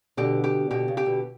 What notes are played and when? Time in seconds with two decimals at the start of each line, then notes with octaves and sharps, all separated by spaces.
0.17 B2 D3 G4
0.44 G4
0.71 B2 D3 G4
0.88 C#3
0.97 G4
1.06 B2 D3